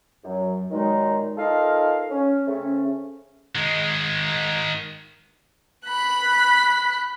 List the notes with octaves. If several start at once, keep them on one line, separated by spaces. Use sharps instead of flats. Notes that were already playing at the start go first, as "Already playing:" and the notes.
F#2 F#3
A#2 D#3 F#3 G#3 D#4
D#4 F4 A4 A#4 F5
C#4
C#3 A3 C4 C#4
D#3 G#3
B5 F#6